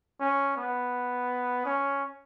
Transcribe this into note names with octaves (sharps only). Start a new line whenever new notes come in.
C#4
B3
C#4